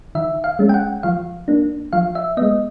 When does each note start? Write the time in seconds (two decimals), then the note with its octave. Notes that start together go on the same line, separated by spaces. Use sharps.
0.15 D#3 E5
0.44 F5
0.59 G#3 C#4
0.69 G5
0.74 F#5
1.03 F3 F5
1.48 A#3 D4
1.93 F3 F5
2.15 E5
2.37 G#3 B3 D#5